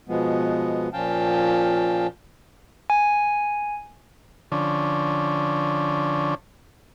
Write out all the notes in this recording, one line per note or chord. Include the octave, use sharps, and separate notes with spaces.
B2 F3 G#3 B3
A#2 F3 C#4 F5 G5 A5
G#5
D3 F3 C#4 D4